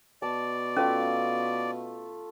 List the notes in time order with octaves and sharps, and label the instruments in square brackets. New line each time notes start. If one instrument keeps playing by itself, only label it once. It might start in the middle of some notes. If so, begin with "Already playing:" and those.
[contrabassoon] B2 [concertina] D5 [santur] A5
[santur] A3 F4 D6 [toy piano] C#4